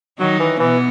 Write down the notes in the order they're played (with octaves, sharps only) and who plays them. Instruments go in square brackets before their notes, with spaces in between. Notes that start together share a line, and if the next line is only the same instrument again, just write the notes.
[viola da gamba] D#3 D#4 [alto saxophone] F#3
[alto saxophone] E3
[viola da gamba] B2 B3 [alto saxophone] E3